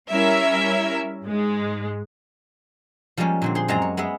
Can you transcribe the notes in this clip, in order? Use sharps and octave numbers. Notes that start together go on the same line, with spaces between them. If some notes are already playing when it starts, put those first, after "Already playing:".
G3 C#4 E4 A#4 E5
G#2 G#3
F3 G3 G#3 A#3 C#4
A#2 D3 C4
G#4 C5 C6
F#2 G#3 C4 D5 G#5 A#5
C#5
G#3 B3 G#4 E5